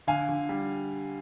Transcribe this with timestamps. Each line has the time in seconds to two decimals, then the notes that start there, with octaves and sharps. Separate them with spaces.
0.07 D3 F5 G#5
0.29 D3
0.49 G3